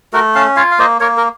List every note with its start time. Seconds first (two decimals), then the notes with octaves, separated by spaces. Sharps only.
0.13 A3 F#4 A#4
0.35 C#4 F5 A5
0.56 F4 C#5 F5
0.71 F5
0.79 A#3 C5 D#5
1.00 A#3 A#4 C#5
1.17 A#4